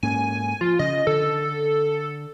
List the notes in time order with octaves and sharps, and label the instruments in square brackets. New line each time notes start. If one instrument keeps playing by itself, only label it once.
[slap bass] G#2 A#3 C#4 [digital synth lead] G#5
[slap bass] F3 [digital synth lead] F4
[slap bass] C#3 [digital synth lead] D#5
[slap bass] D3 [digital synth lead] A4